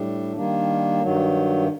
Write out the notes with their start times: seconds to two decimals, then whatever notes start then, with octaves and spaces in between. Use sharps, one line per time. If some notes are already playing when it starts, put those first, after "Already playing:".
Already playing: A2 G3 D4
0.37 D#3 G3 A#3 D4
1.02 G2 D#3 F#3